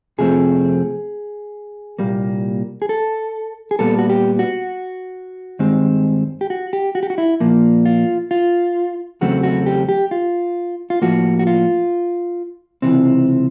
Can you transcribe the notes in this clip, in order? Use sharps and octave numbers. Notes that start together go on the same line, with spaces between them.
F2 C3 F3 A3 C4 G#4
C2 A#2 G3 A#3
G#4
A4
G#4
A#2 G3 B3 A4
F#4
G4
F#4
G2 D#3 G#3 C4
G4
F#4
G4
F#4
G4
F#4
E4
A#2 F3 A#3
F4
F4
E2 C#3 F#3 A3 C4 F#4
F#4
G4
G4
F4
F4
A2 F3 A#3 F#4
F#4
F4
C#2 C3 E3 C4